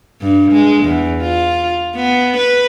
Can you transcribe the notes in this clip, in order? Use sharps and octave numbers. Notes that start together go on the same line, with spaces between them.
G2
G#3
E2
F4
B3
B4